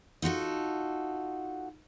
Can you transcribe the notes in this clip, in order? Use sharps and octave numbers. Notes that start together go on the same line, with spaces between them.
D#4 F4 F#4 A4